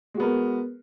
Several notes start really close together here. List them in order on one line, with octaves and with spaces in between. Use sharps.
G#3 F#4 B3 A#4